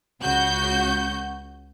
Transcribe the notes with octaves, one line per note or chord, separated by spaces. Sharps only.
C#2 C#3 F#4 G6